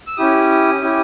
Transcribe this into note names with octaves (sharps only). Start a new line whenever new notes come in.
E6
C#4 E4 G4 D#6
D#6
C#4 E4 G4